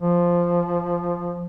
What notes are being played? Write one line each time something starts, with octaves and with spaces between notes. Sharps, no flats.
F3